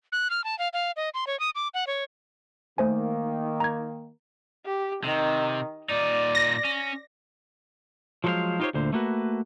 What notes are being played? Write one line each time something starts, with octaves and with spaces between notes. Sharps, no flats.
F#6
F6
A5
F5
F5
D#5
C6
C#5
D#6
D6
F#5
C#5
D#3 A3 A#3 C5 G#5
A#5 G#6
G4
C3 D#3
A#2 D#4 D5
A#6
C#4
F3 F#3 G#3 A4 C5 F5
D#4 F4 G4 A#4 C5 C#5
D2 A#2 D3 C5
A3 A#3 F#4 B4